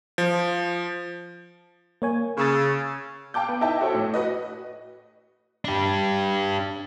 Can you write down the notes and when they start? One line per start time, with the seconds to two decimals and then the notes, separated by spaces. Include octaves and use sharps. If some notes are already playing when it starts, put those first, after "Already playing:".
0.18 F3
2.02 A#3 C#5 G#5
2.38 C#3 C#6 E6 A6
3.34 F5 G5 A5 D6 G6
3.48 B3
3.61 D#4 E4 D#5 E5 G5 A5
3.81 F#4 A4 C5 C#5
3.94 A2
4.14 F#4 B4 D#5
5.65 D4 G4